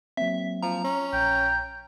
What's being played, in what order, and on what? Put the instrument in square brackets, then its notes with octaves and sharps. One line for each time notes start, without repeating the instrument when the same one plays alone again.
[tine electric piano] F#3 A#3 C4 [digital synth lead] E5
[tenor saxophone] F3 [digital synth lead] A#5
[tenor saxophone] C#4
[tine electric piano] A#1 [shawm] G5